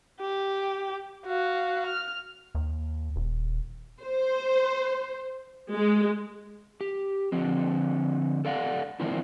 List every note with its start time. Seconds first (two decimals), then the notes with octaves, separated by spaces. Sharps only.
0.20 G4
1.26 F#4 F5
1.86 F6
2.55 D#2
3.16 D#1
4.03 C5
5.74 G#3
6.81 G4
7.32 D3 F3 C4
8.45 A4 D5 F5 F#5
9.00 D#3 F3 A#3 C4 D4 E4